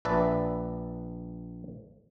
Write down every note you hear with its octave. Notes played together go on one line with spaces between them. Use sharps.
A#1 B4 D5 E5 A5